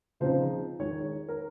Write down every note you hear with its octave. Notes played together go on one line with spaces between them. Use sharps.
C#3 F3 C4 D#4 C5
D#3 G#3 D#4 C#5
A#4